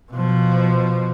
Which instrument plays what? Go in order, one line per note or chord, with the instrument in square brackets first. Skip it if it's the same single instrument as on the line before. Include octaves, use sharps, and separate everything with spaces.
[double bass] B2 F3